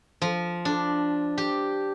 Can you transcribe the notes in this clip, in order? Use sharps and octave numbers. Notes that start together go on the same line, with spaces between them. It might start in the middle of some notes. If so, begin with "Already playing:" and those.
F3
D4
G4